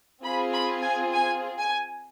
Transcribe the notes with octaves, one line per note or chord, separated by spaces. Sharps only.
C4 F4 G#4 B5
B5
G#5
G#5
G#5